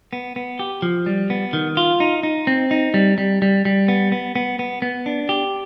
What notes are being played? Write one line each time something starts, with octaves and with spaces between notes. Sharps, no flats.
B3
B3
G4
F3
G3
B3
D#3
F4
D#4
D#4
C4
D#4
G3
G3
G3
G3
B3
B3
B3
B3
B3
D4
G4